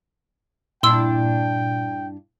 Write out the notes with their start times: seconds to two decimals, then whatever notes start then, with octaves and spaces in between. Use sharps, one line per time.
0.83 G2 A#2 D4 E4 G5 C6 E6